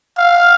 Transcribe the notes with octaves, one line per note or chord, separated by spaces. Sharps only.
F5